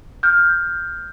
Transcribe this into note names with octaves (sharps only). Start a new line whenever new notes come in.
F6 G6